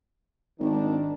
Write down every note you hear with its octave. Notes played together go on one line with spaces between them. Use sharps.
G#1 D#3 D4